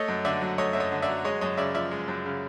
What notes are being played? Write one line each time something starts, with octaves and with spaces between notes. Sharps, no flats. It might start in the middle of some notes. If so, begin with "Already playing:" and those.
Already playing: A3 C#5 D#5
F#2
D3 D5 E5
F#3
A3 C#5 D#5
F#2 E5
C#5 D#5
D3
D5 E5
F#3
G#3 C#5 D#5
F#2 C#5 D#5
C#3 D5 E5
F3 D5 E5
G#3
F#2
C#3